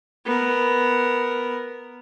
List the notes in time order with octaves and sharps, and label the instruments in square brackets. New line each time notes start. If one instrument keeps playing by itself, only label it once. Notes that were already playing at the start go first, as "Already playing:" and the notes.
[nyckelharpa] B3 A#4